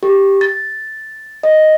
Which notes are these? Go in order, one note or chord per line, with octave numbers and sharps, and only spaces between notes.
G4
A6
D#5